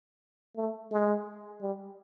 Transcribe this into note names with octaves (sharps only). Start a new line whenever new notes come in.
A3
G#3
G3